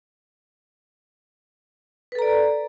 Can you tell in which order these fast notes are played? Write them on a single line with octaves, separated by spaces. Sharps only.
B4 A4 A#5 D5